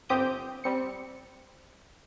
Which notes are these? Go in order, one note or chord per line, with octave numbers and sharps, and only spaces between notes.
G1 C4 G4 D#6 G6
G3 C4 C#7